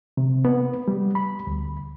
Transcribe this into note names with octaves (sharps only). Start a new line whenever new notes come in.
C3
B3
G3
B5
D2